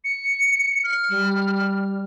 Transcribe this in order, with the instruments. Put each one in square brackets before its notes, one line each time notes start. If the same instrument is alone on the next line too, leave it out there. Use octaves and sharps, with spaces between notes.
[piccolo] C#7
F6
[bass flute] G3